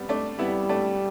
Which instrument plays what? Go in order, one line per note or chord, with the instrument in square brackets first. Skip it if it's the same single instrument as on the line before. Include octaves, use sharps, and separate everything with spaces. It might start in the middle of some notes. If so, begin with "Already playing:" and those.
Already playing: [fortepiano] G3 B3
A3 D4
[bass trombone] G3 [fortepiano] B3 E4
[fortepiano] A3 D4